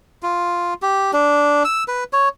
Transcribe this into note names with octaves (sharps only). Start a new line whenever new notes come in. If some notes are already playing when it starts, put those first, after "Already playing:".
F4
G4
D4
E6
B4
C#5